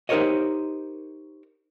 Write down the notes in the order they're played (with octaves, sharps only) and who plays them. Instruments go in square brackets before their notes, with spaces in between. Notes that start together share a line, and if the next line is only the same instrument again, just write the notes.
[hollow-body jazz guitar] D#4 G4 A#4 C5 C#5 D#5